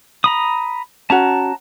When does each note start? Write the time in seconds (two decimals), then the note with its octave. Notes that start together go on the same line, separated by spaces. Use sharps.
0.24 A#5 B5 D#6
1.10 C#4 F#4 A5 A#5